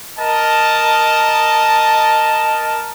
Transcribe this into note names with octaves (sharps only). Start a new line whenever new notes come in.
A#4 D#5 A5